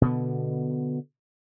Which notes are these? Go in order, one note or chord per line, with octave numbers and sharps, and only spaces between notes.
B2 D3 B3